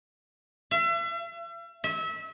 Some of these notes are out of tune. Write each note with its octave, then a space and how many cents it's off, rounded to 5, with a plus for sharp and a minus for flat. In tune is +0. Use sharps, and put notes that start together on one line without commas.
E5 +40
E5 -25